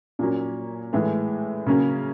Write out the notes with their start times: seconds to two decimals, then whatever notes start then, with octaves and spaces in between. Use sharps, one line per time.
0.19 A#2 F#3 A#3 C#4
0.93 A2 E3 G#3
1.66 C#3 F#3 A#3 C#4